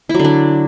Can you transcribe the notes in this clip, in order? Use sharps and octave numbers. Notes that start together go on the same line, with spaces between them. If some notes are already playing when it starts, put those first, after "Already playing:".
E4
F#3
D3
D4